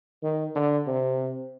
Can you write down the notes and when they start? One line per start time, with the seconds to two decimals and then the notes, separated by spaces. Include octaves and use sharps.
0.23 D#3
0.55 D3
0.87 C3